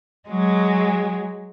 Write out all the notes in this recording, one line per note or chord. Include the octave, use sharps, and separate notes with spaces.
F#3 G#3